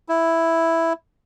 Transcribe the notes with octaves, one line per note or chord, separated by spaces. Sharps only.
E4